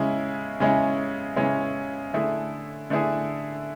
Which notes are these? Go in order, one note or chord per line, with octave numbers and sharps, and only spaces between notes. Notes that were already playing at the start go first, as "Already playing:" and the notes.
Already playing: C#3 G#3 C#4 E4
C#3 G#3 C#4 E4
C#3 G#3 C#4 E4
D3 A3 E4 G#4
D3 A3 E4 G#4